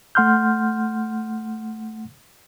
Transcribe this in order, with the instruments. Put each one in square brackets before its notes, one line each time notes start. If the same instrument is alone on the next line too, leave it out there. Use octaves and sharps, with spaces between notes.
[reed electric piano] A3 F#5 C6 F6 G6